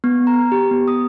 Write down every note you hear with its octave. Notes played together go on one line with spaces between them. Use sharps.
B3
A#5
G4
B3
D#6